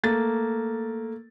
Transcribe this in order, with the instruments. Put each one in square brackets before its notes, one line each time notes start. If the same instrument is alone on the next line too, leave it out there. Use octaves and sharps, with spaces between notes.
[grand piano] A3 A#3 A6